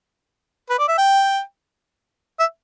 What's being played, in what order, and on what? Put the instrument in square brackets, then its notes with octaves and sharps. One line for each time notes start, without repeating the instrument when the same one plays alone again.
[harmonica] B4
D5
E5
G5
E5